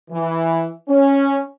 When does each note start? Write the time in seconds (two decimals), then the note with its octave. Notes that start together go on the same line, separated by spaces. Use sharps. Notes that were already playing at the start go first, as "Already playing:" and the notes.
0.11 E3
0.89 C#4